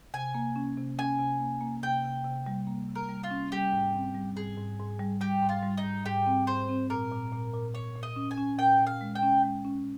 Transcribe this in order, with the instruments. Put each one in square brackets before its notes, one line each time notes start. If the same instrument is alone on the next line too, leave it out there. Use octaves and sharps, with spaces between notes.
[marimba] C3 [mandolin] G#5
[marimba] A#3
C#4
C3
[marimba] C#4 [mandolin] G#5
[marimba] C3
A#3
A#3
[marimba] C3 [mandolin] G5
[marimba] C3
C3
G3
A#3
C3
[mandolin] A#4
[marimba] G3
[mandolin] F4
[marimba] C#4
[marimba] G3 [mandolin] G4
[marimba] G#2
C4
G3
[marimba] G#2 [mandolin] G#4
[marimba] G#2
G#2
G3
[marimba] G3 [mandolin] G4
[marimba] G#2
[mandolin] F4
[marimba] G3
[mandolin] D#4
[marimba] G#2
[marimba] G#2 [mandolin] G4
[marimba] C4
[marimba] G#2 [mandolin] C5
[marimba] C4
[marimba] A#2 [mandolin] A#4
[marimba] A#2
A#2
A#2
[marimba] A#2 [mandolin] C#5
[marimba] A#2
[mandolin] D#5
[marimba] C#4
[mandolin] G#5
[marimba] C#4
[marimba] A#2 [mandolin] G5
[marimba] A#2
[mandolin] F5
[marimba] G#3
[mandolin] G5
[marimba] C#4
G#3
C#4